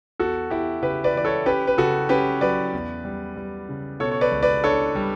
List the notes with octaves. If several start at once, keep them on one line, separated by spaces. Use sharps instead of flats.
E2 F#4 A4
E3 E4 G4
C#3 G4 B4
B4 D5
E3 D5
A4 C#5
C#4 G4 B4
B4
C#3 F#4 A4
C#4 G4 B4
F#3 B4 D5
E2
G3
G3
C#3
B2 A4 C#5
C#5
B4 D5
C#2
B4 D5
D4 A4 C#5
G3